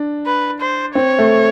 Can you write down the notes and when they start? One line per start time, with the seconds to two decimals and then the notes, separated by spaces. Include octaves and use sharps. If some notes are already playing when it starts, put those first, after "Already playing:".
Already playing: D4
0.26 B4
0.61 C5
0.95 C4 C#5
1.19 A3